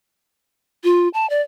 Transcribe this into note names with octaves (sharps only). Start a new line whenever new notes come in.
F4
A5
D5